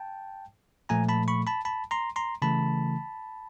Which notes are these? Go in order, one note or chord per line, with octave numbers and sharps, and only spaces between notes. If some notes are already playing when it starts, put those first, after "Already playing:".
Already playing: G5 A5
A#2 F3 A3 G#5 A#5
A5 B5
B5 C#6
A5 B5
A5 B5
A#5 C6
A#5 C6
C#3 E3 A3 A5 B5